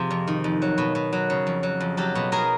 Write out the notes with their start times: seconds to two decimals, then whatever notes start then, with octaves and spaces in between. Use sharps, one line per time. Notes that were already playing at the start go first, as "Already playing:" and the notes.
Already playing: C3 F3 G#4
0.10 F2
0.27 D#3
0.44 F2
0.62 F#3
0.78 B2
0.95 B2
1.13 F#3
1.30 C#3
1.47 F2
1.63 F#3
1.80 F2
1.97 F#3 G4 A4
2.15 B2
2.32 B2 G#4 A#4